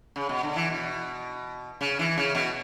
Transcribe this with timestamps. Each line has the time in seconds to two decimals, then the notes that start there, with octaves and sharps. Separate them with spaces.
0.16 C#3
0.29 B2
0.43 D3
0.56 E3
0.70 B2
1.81 C#3
1.99 E3
2.17 C#3
2.35 B2